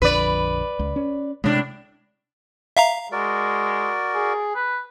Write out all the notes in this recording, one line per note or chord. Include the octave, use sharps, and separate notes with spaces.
A#1 F2 D3 B4 D5
C#2
C#4
A2 C3 G#3 D4
E5 F5 A#5
G#3 F#4 A#4 D5
G#4
B4